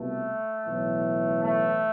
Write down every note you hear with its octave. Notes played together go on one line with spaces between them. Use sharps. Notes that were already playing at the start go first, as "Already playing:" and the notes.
Already playing: C2 B2 A3
B1 A2 E3
A3